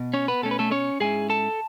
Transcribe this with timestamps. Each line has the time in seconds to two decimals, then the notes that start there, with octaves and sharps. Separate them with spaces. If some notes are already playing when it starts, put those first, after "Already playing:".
Already playing: B2
0.14 C#4 C#5
0.28 B3 B4
0.42 B2 A3 C#4 A4
0.51 B4
0.59 A3 A4
0.71 C#4 C#5
1.00 G#2 G#3 C#4 E4 G#4 G#5
1.30 A4 A5